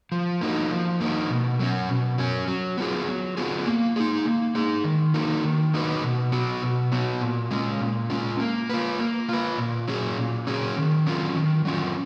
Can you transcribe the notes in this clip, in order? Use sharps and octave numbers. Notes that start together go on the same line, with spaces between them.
F3
A#3 D#4 F#4
F3
A#3 D#4 F#4
B2
F#3 C#4
B2
F#3 C#4
F#3
B3 F4 G#4
F#3
B3 F4 G#4
A#3
D#4 G#4
A#3
D#4 G#4
D#3
A#3 D#4 F#4 B4
D#3
A#3 D#4 F#4 B4
B2
F#3 B3 F#4
B2
F#3 B3 F#4
A#2
G#3 C#4 F4
A#2
G#3 C#4 F4
A#3
F4 B4
A#3
F4 B4
A#2
F#3 C#4 G#4
A#2
F#3 C#4 G#4
D#3
F#3 C#4 F4
D#3
F#3 C#4 F4